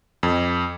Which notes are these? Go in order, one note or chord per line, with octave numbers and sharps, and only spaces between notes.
F2